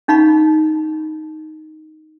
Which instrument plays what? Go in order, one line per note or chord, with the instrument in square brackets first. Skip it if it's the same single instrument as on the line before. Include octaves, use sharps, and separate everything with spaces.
[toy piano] C#4 D#4 F5 B5 C#6